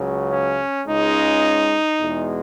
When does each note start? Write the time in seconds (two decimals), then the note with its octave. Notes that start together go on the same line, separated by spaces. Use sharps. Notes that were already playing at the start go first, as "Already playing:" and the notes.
Already playing: C#2 C#3 F#3
0.29 C#4
0.86 C#2 C#3 G#3 D#4
2.00 E2 B2 G#3